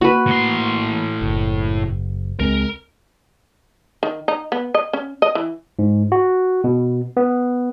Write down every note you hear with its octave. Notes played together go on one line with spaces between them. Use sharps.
A#3 F#4 B4
A2 C6
F#1
C#2 G#3 C4 A#4
D#3
D#4
B3
D#5
C#4
D#5
E3
G#2
F#4
B2
B3